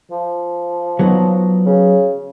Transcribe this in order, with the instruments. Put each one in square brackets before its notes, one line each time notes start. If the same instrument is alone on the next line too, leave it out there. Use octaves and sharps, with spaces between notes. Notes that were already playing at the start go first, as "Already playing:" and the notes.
[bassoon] F3
[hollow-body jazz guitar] F#3 B3 D#4
[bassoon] C#3